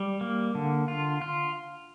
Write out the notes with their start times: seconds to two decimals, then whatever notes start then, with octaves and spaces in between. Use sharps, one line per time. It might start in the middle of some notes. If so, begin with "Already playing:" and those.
Already playing: G3
0.21 A#3
0.55 D3
0.88 F4
1.21 F4